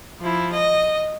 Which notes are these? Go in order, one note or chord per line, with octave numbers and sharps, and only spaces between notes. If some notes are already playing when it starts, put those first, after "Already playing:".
F3 E4
D#5